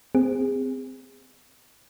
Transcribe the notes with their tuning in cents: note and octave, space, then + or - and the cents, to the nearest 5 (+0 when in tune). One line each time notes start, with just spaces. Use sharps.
C4 -20 G#4 -30